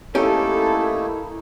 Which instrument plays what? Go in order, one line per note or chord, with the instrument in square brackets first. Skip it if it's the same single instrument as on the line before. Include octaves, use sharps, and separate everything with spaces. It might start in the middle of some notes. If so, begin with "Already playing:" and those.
[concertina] A3 A#3 D#4 [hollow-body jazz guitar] C#4 G4 [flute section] E4 [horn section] A4